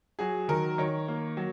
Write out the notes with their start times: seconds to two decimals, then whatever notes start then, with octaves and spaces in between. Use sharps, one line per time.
0.19 F#3 G#4
0.48 D#3 A#4
0.78 D#3 C#5
1.08 A#3
1.37 F#3